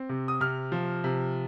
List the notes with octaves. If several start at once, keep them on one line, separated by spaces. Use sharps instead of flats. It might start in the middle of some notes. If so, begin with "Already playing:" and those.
Already playing: C4
C3
D#6
C3 F6
F3
C3